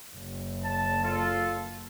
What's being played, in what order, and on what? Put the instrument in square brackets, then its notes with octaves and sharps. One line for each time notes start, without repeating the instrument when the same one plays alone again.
[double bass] F#1
[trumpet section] A5
F4 A4